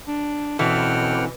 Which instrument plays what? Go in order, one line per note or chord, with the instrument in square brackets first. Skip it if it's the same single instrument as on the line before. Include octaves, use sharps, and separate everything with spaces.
[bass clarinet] D4
[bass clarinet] B2 [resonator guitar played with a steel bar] E3 [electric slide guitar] C4 C#4 A4 [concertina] F#5 G5 F6